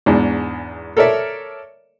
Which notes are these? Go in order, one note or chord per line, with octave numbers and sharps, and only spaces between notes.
E2 G#2 D4
A4 A#4 C#5 D5 E5